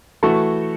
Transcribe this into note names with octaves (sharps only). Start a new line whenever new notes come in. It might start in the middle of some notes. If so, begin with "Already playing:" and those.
E3 A3 F#4 A4